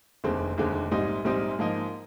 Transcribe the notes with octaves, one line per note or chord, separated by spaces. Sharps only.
F1 D#2 D3 G#3 C4
F1 D#2 D3 G#3 C4
A#1 G#2 G3 C4 D#4
A#1 G#2 G3 C4 D#4
G#2 F3 A#3 D#4